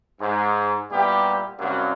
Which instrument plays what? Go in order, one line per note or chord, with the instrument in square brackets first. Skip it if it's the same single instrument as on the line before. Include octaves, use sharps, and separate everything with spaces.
[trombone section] G#2
A#2 G3 B3 E4 G4
C2 F#2 F#3 G3 A#3